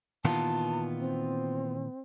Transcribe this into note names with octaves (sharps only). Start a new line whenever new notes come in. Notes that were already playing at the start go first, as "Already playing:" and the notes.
A#2 D#3 E3 B3 F4 A5
C4